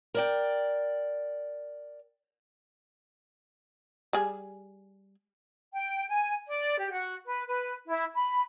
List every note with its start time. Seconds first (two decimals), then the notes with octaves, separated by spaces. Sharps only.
0.14 A#4 D5 G5
4.13 G3 G#4
5.74 G5
6.09 G#5
6.46 D5
6.79 G4
6.91 F#4
7.26 B4
7.47 B4
7.87 E4
8.13 B5